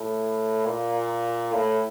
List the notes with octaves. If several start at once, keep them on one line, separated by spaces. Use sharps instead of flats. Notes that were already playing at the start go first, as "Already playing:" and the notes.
Already playing: A2
A#2
A2